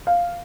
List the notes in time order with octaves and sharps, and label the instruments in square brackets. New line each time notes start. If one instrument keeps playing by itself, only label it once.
[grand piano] F5